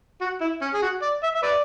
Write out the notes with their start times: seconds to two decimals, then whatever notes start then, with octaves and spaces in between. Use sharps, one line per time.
0.21 F#4
0.41 E4
0.61 C#4
0.73 G#4
0.82 F#4
1.02 D5
1.23 E5
1.34 E5
1.42 B4 D5